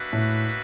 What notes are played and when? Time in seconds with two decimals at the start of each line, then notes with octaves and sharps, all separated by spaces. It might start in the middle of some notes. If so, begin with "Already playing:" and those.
Already playing: A#3 D4 F#4 B4 E5
0.13 A2